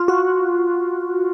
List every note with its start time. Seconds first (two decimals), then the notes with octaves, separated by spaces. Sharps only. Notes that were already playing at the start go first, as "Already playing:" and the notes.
Already playing: F4
0.08 F#4